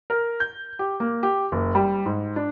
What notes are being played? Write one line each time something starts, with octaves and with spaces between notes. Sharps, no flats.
A#4
G6
G4
A#3
G4
F#1
G3
G#2
D4